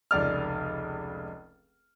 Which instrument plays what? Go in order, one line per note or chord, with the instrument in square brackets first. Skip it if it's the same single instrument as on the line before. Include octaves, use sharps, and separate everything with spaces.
[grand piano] F1 C#2 D5 F6